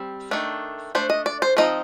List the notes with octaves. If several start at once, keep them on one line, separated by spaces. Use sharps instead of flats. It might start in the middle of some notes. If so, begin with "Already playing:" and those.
Already playing: G3 C4
D#3 A3 D4
A3 D4 C5
D#5
D5
C5
F3 C4 D#4 D#5